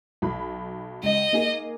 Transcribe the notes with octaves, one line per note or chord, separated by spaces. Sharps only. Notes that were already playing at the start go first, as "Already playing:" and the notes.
B1 B5
C#2 D#5
A#3 D#4 G#4